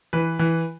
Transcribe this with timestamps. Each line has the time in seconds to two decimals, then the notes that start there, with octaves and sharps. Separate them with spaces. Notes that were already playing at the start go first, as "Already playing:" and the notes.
0.13 E3 B4
0.39 E3